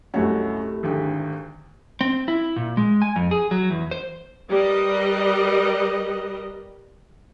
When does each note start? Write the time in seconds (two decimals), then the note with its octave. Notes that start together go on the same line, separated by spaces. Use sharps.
0.14 C2 F#2 A3 F#4 C#5 D#5
0.83 G#1 D2 G4
2.01 C4
2.28 E4
2.56 A#2
2.77 G#3
3.02 G#5
3.16 F2
3.31 G#4
3.51 F#3
3.70 E2
3.91 C5
4.49 G3 G4 A#4 B4 D#5